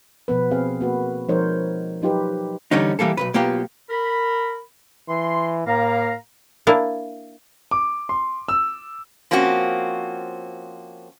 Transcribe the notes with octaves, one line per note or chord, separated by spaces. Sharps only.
B2 F3 B3 B4
C4 G#4 F5
A#3 F#4 B4
F3 G#3 D#4 A#4 C5 C#5
F#3 D#4 F4 G4 B4
E2 D3 G3 C#4 D#4
E3 G3 A#3 A4
B1 F2 B4
B1 A#3 B3 F4 G4
A#4 B5
E3 C6
A2 A#3 F5 A#5
A#3 D4 E4
D6
C6
E6
F3 A#3 C4 C#4 F#4